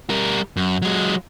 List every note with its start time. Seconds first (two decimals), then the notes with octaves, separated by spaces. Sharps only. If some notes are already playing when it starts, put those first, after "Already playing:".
0.10 G3 A#4
0.56 F#2
0.82 F#3 G#3